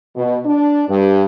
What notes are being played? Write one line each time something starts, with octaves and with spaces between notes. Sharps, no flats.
B2
D4
G2